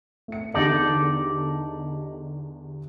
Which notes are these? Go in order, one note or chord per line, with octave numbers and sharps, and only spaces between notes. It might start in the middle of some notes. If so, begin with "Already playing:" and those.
A3 C#7
E2 D3 D#4 G4 A4 D5